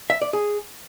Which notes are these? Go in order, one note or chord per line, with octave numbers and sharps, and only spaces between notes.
E5
D5
G#4